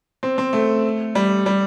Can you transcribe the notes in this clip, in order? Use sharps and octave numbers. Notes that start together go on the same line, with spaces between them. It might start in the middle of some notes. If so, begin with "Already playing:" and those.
C4
C4
A3
G3
G3